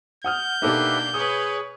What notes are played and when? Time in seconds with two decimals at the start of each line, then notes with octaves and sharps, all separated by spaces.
0.24 F#5 D#6 F6 G6
0.62 B2 A#3 D4 D#4 G4 A4 B4 E5
1.14 G#4 B4 C#5 D#6